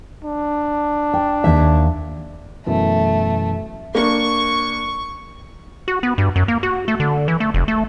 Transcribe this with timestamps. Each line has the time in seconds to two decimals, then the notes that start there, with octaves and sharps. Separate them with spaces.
0.24 D4
1.14 G5
1.44 D#2 E5
2.67 F#2 B2 E3 A3
3.95 A#3 D4 C#6
5.88 F#4
6.03 B3
6.18 G2
6.36 F#2
6.48 A#3
6.63 F#4
6.88 A3
7.00 D3
7.28 E3
7.40 A3
7.54 F1
7.68 A3